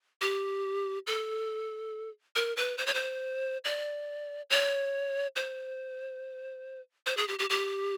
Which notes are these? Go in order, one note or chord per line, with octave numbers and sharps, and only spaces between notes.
G4
A4
A#4
B4
C5
C#5
C5
D5
C#5
C5
C5
G#4
G4
G4
G4